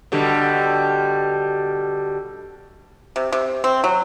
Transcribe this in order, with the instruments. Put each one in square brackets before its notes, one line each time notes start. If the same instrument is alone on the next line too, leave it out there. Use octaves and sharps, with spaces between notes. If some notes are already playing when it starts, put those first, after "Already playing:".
[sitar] B2 D3 G3
[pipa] C3
C3
C4
F#3